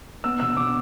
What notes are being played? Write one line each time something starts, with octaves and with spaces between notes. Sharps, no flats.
B3 E6
B2 E6
B2 D6